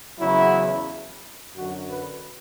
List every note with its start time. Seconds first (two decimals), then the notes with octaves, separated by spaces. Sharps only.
0.19 E2 C#3 F#3 E4
1.56 F#2 D3 F#3 F#4
1.90 B4